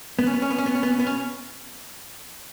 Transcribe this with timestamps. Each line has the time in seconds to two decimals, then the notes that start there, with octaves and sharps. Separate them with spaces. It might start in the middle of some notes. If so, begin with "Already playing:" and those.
0.19 B3
0.27 C#4
0.34 B3
0.42 C#4
0.50 B3
0.58 C#4
0.66 B3
0.75 C#4
0.83 B3
0.91 C#4
0.99 B3
1.07 C#4